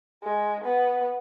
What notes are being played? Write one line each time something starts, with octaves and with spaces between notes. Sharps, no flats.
G#3
B3